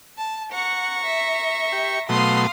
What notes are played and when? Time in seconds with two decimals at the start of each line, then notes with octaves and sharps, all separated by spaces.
0.18 A5
0.52 F#5 A#5 C#6
1.05 E5
1.72 G4
2.09 B2 F#3 A3 F5 C6 D#6